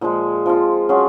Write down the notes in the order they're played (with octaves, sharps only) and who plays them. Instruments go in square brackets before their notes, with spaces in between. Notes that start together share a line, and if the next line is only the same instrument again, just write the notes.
[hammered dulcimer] A#2 F3 G#3
F3 C4 F4
F#3 C#4 F4 G#4